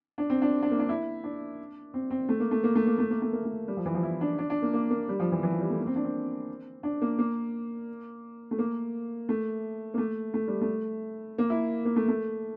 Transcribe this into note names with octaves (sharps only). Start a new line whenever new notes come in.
D4
C4
D4
D4
A#3
D4
E4
D4
C4
C4
A3
A#3
A3
A#3
A3
A#3
A3
A#3
A3
A#3
A3
G3
F3
E3
F3
E4
D4
D4
D4
A#3
A#3
A#3
G3
F3
E3
E3
F3
G3
A3
A#3
C4
D4
C4
D4
A#3
A#3
A3
A#3
A3
A#3
A3
A3
G3
A3
A#3
E4
A#3
A3
A3